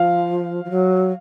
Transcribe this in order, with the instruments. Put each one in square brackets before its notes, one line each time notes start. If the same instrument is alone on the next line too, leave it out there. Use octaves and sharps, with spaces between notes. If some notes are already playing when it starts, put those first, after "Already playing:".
Already playing: [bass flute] F3 [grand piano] F5
[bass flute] F3
F#3